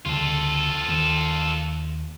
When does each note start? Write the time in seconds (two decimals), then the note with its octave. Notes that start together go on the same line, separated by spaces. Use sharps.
0.06 D2 C#3 F3 F4 A4
0.88 D#2